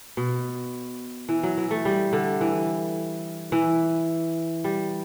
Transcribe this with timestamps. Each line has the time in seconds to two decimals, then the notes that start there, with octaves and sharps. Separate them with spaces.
0.17 B2
1.29 E3
1.43 F#3
1.57 E3
1.71 A3
1.85 G3
2.13 D3
2.41 E3
3.52 E3
4.64 G3